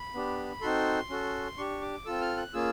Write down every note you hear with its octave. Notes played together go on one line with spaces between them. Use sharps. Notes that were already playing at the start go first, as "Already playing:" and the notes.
Already playing: B5
B3 D4 G4
C4 D#4 F#4 A4 C6
C#4 F#4 A4
D4 G4 C#6
D6
C4 F4 A4 E6
F6
F#6
A#3 C#4 F4 G#4 E6